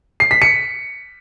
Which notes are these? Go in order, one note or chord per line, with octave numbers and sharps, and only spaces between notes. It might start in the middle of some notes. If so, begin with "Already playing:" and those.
C7
B6
C#7